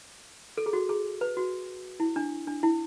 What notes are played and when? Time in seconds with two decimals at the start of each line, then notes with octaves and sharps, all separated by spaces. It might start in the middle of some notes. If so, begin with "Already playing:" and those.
0.58 A4
0.66 G#4
0.73 F#4
0.89 G#4
1.21 B4
1.37 F#4
2.00 E4
2.16 D4
2.47 D4
2.63 E4